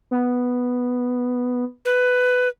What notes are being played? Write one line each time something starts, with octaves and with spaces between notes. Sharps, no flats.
B3
B4